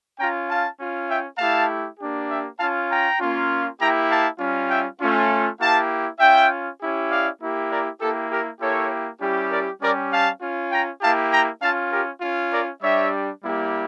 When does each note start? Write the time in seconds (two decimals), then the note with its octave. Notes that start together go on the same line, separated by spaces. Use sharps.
0.18 C#4 F4 G5 A#5
0.48 F5 A5
0.78 C#4 F4
1.08 E5 G5
1.38 A3 E4 G4 F5 A5
1.98 A#3 D4 G4
2.29 E5 G5
2.58 C#4 F4 F5 A5
2.89 G5 A#5
3.19 A#3 C#4 F4
3.79 A#3 E4 G4 G5 A#5
4.09 F5 A5
4.39 G3 C#4 F4
4.69 E5 G5
5.00 A3 C#4 F4
5.59 A#3 E4 G4 F5 A5
6.19 C#4 F4 E5 G5
6.80 C#4 E4 G4
7.10 D5 F5
7.40 A#3 E4 G4
7.70 A#4 D5
8.00 A#3 E4 G4 A4
8.30 G4 A#4
8.60 A#3 E4 G4 A4 C#5
9.20 G3 C#4 E4 G4
9.51 A#4 D5
9.81 G3 C#4 G4 A#4 D5
10.11 F5 A5
10.42 C#4 F4
10.72 G5 A#5
11.01 A#3 E4 G4 F5 A5
11.31 G5 A#5
11.61 C#4 F4 F5 A5
11.91 G4 A#4
12.21 C#4 F4
12.51 A#4 D5
12.81 G3 D4 G4 C#5 E5
13.42 G3 A#3 E4 G4